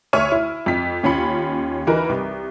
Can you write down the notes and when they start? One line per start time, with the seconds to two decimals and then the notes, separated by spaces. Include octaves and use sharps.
0.13 D2 C#5 E5 F6 D#7
0.32 E4
0.66 F2 B6
1.03 D#2 C#4 F4 B5 C#7
1.87 E3 D#4 F#4 A#4 B4
2.09 C2